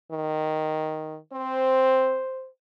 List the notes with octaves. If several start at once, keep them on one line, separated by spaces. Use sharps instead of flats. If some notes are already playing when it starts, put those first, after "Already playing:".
D#3
C4 C5